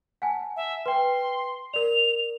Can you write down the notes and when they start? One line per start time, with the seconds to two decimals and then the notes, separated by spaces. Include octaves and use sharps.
0.22 F#5 G#5 A5
0.56 E5
0.86 B4 G5 C6
1.74 A#4 D5 F7